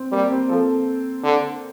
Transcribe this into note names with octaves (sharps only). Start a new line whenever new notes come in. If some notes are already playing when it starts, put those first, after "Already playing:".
Already playing: C4
G3 A#3
C4
F3 A4
D3